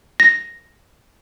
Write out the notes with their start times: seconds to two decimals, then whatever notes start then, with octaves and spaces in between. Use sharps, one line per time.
0.20 A#6